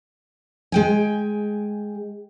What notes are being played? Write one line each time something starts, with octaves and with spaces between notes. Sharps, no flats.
G#3 G5 G#5